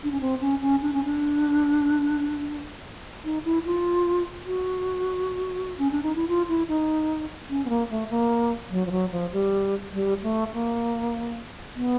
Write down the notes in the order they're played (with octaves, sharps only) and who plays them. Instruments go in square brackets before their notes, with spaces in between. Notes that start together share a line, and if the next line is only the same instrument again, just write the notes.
[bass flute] D4
C#4
C4
C#4
C#4
D4
C#4
D4
D#4
E4
F4
F#4
C#4
D4
D#4
E4
F4
E4
D#4
C#4
B3
A#3
A3
A#3
F#3
F3
F#3
F3
G3
G3
A3
A#3
B3